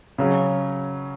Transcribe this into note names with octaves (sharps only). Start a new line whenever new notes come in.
C#3 F#3 C#4